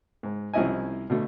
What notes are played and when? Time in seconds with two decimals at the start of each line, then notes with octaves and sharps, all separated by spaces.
0.23 G#2
0.54 C2 F3 C#4 E4 D#5 G#5
1.10 B2 D3 A3